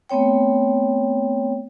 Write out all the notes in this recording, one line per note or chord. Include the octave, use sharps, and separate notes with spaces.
A3 B3 C4 C#5 G5